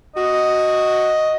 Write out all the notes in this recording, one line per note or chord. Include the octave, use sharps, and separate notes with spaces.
F#4 D#5